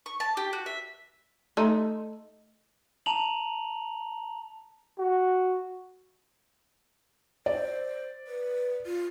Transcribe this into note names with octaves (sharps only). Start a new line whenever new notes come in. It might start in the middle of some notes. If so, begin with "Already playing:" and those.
C#6
A5
G4
F#4
E5
A3 D#4
A5 A#5 F7 F#7
F#4
C5 D5
B4
F4